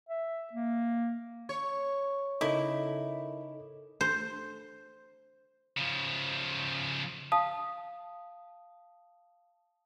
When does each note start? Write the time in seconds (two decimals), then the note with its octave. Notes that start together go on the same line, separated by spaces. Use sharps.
0.09 E5
0.53 A#3
1.49 C#5
2.41 C#3 D#4 E4 A4 A#4 D#5 D6
4.01 C5
5.77 C#3 F3
7.32 F5 A5 D#6